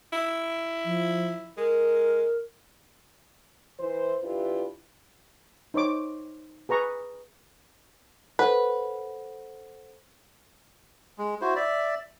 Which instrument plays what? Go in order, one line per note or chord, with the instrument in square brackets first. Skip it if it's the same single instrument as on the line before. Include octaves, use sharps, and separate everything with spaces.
[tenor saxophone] E4
[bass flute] F3
[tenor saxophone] G#3 [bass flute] A#4
[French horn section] E3 C5
E3 D4 E4 F4 G4 B4
[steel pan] D#4 C5 C#5 D6
G#4 B4 A#5 C#6
[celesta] A4 C5 F#5 [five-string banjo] B4
[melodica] G#3
E4 F#4 C5
D5 E5